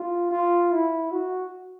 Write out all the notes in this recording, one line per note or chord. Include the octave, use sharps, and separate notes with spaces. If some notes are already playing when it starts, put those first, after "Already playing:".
Already playing: F4
F4
E4
F#4